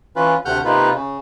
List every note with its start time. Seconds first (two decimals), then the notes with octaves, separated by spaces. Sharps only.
0.16 E3 C#4 F4 B4
0.45 D2 C3 A3 F#5 F6 G6
0.65 C3 A#3 D#4 F4 B4
0.94 C#3